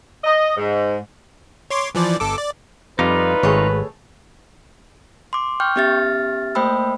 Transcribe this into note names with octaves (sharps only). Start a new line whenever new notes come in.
D#5
G#2
C#5 C6 D6
E3 F3 D5
G1 A4 D6
D5
F2 G3 D#4 F4 B4
G#1 A3 G#4 C#5
C6 D6
G5 C#6 F6 G6
B3 C#4 G4 E5 F6 A6
A3 A#3 C5 G5 B5 E6